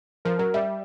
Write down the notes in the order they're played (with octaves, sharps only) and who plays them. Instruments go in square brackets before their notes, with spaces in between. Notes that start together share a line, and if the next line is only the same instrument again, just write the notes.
[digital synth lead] F3 [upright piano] A#4
[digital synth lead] F#3 [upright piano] A#4
[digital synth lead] G3 [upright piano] E5